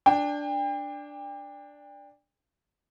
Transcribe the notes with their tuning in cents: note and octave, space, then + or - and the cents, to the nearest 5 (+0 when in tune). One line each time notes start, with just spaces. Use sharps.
D4 +0 G5 +35